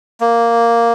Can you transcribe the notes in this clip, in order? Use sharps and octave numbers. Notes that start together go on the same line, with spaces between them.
A#3